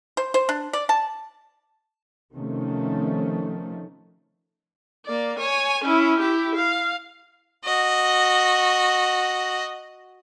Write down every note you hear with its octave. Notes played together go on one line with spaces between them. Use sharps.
C5
C5
D4
D5
A5
C3 D#3 F3 A3 C#4
A#3 D5
C#5 G#5
C#4 E4
E4 G4
F5
F#4 D#5